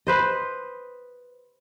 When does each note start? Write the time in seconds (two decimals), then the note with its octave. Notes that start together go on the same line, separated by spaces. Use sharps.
0.07 B4 C5 D#5